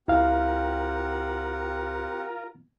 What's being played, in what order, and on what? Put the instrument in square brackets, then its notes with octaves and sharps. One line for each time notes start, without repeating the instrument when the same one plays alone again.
[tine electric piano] C#2 [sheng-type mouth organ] C4 G4 F#5 [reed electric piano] E4 F5 [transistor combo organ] F4 A#4